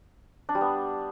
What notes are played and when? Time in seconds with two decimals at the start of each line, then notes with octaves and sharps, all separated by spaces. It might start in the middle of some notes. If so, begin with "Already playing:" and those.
0.49 D4
0.55 G3
0.61 B3